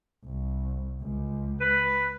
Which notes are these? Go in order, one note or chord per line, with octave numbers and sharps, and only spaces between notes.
C2
C#2
B4